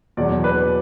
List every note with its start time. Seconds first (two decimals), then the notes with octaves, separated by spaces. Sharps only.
0.17 E2 B2 F#3 D5
0.44 B4